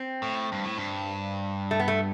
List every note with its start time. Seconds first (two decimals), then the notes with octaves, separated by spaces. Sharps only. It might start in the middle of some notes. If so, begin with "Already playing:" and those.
Already playing: C4
0.22 A2
0.52 G2
0.64 A2
0.77 G2
1.71 A3
1.80 B3
1.88 A3